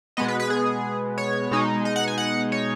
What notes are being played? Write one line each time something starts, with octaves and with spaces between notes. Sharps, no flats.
B2 G#3 B3 D#5
B4
B4
G#4
C#5
B2 G#3 D#4
D#5
F#5
G#5
F#5
C#5